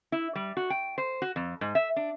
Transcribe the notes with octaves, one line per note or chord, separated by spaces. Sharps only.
E4
G3
F#4
G5
C5
F#4
F2
G#2
E5
D4